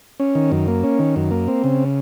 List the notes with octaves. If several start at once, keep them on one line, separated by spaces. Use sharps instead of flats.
C#4
D#3
F#2
A#3
C#4
D#3
F#2
A#3
C4
C#3